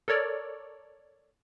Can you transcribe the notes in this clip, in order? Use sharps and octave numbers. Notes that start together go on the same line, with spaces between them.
A4 A#4 C#5 D5